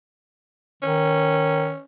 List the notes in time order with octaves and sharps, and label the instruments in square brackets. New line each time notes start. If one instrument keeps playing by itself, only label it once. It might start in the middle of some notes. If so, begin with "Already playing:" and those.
[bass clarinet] D#3 [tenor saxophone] C#4